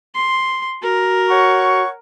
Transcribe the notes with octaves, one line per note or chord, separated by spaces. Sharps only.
C6
F#4 A#4
C#5 F#5 C#6